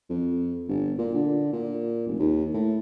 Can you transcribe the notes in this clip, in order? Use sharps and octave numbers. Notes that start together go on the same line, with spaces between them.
F2
G1
A#2
D3
A#2
F1
D#2
A2